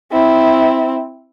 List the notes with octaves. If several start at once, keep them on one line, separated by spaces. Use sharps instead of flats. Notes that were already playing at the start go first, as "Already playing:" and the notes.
C4 E4